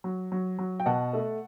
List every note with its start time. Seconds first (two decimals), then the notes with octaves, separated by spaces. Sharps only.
0.04 F#3
0.32 F#3
0.59 F#3
0.80 G5
0.86 B2 F#5 A5
1.13 A3